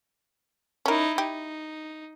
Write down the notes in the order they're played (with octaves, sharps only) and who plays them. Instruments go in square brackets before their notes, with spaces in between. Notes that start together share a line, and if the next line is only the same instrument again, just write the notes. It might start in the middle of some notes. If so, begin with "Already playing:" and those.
[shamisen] C#4 A#4 [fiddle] D#4 E4
[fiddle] D#4 [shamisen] G4